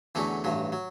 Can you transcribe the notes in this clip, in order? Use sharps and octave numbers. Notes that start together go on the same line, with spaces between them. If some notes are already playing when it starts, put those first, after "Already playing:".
E2 D3 F#3 A3 C#4
A1 G2 F#3
F#3